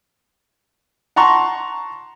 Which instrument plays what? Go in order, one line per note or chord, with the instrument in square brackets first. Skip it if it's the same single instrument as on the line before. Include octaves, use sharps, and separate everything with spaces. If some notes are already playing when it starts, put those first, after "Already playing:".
[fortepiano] F#5 A5 A#5 C6 C#6